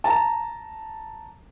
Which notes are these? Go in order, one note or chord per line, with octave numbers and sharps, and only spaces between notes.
A5 A#5